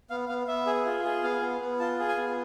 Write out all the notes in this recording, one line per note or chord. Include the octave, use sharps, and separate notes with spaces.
B3 F5
B3 F5
B3 E5
G#4
F4
G#4
B3 F5
B3
B3
F4 A5
G#4
G#5
B3